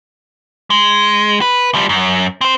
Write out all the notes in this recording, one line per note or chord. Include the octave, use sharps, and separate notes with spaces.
G#3
B4
F3 G3
F#2
C4 C5